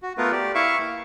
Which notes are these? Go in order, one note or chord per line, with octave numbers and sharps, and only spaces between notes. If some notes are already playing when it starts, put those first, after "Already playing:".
F#4
A3 B3 F4 A#4 B4
G4 D5
E4 E5 F5 C#6
A#3